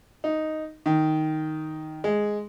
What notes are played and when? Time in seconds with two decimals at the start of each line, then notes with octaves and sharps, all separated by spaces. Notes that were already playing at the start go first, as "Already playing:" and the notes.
0.24 D#4
0.86 D#3
2.04 G#3